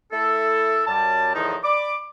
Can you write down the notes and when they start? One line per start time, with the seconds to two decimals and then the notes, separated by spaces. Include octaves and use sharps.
0.12 A3 E4 A4
0.87 F#2 G3 A5
1.34 E2 A2 D#3 F3 B3 D#4
1.64 D5 B5 D6